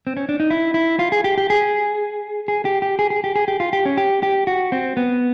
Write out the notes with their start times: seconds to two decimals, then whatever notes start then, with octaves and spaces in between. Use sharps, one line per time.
0.07 C4
0.17 C#4
0.29 D4
0.40 D#4
0.50 E4
0.74 E4
0.99 F4
1.12 G#4
1.24 G4
1.38 G4
1.50 G#4
2.48 G#4
2.65 G4
2.82 G4
2.99 G#4
3.10 G#4
3.24 G4
3.36 G#4
3.48 G4
3.60 F4
3.73 G4
3.85 C#4
3.97 G4
4.23 G4
4.47 F#4
4.72 C4
4.97 B3